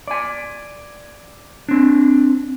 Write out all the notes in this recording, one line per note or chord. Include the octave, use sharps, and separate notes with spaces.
D5 G#5
C4 D4